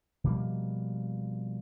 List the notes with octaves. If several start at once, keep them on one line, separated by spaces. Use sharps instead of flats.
B2 F3 G3 A#3